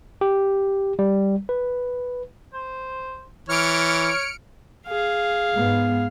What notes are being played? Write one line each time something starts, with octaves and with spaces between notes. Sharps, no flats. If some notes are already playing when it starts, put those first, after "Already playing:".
G4
G3
B4
C5
E3 C#5 F6 C#7 D7
G#4 F5
G#2 B3